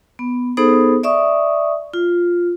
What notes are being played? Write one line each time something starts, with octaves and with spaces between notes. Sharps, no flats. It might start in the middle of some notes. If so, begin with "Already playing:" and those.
B3
B3 D#4 G#4 A4 C5 D#6
D5 E5 C#6 D#6
F4